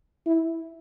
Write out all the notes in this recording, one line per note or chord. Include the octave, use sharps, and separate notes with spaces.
E4